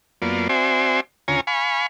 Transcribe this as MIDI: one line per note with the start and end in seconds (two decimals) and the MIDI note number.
0.22 0.48 42
0.22 0.48 58
0.22 0.48 59
0.22 0.48 65
0.22 0.48 74
0.49 1.00 60
0.49 1.00 66
0.49 1.00 72
0.49 1.00 74
0.49 1.00 76
0.49 1.00 80
1.28 1.41 38
1.28 1.41 49
1.28 1.41 65
1.28 1.41 73
1.28 1.41 80
1.28 1.41 82
1.47 1.87 77
1.47 1.87 80
1.47 1.87 83
1.47 1.87 85